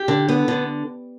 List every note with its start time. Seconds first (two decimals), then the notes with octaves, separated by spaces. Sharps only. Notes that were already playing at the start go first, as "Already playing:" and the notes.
Already playing: G4
0.08 D3
0.29 B3
0.48 D3